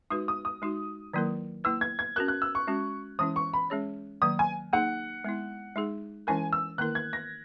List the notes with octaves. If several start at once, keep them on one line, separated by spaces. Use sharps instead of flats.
G#3 D#4 F#4 B4 D#6
D#6
D#6
G#3 D#4 F#4
D#3 F#3 A#3 E4 A#4
A#3 E4 B4 E6
G#6
G#6
C#4 F#4 A#4 F#6
F#6
E6
C#6
G#3 C#4 F#4
E3 G#3 C#4 E4 D#6
C#6
B5
G#3 C#4 G#4 C#5
D#3 F#3 A#3 D#6
G#5
A#3 D#4 G#4 F#5
G#3 B3 E4
G#3 D#4 G#4
E3 G#3 C#4 E4 A#4 G#5
E6
D#3 A#3 E4 A#4 F#6
G#6
A#6